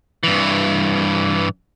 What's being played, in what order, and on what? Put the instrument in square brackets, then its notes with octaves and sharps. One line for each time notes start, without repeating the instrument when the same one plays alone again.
[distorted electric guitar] G2 E3